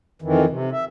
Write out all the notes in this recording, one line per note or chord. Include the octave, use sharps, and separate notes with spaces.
F2 D#3 E3
C3
E5